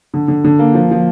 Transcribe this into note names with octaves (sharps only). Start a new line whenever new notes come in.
D3
D3
D3
A#3
F3
F3